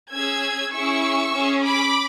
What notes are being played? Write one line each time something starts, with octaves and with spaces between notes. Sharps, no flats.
C#4 G#4 E6 G#6
C#4 E4 G#4 C#6 E6
C#4 G#4
B5 D6